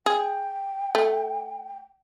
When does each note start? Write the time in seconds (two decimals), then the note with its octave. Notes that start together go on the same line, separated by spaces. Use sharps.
0.06 G#4 G5
0.95 A3